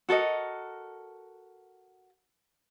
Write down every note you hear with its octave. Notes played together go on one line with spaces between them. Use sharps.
F#4 A4 A#4 D#5